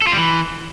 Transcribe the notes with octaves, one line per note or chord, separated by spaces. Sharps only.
A4
F4
G3
E3